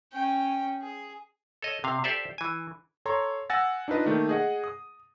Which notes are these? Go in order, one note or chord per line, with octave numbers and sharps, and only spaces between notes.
C#4 G5
G#4
A4 C#5 D#5
C3 F5
G4 A4 C5 D5 E5
E3 G#5
A4 C#5 A#5 C6
F#5 G#5 E6 A6 A#6
D4 D#4 F4 B4 D#5
D#3 A3 A#3
G#4 D#5 F#5
D#6